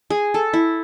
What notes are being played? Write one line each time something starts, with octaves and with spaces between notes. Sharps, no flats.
G#4
A4
E4